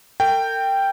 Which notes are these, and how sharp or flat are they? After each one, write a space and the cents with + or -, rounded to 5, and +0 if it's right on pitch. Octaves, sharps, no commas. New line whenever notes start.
A#4 -45 G5 +0